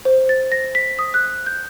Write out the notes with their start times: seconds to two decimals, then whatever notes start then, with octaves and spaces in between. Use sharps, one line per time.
0.05 C5
0.29 A6
0.52 A#6
0.75 B6
0.99 D#6
1.14 F#6
1.46 G6